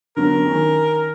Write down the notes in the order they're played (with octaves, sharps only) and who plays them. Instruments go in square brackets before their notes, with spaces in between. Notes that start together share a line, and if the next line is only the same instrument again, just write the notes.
[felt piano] D3 F#3 B3 [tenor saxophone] A#4
[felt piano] D#3 C#4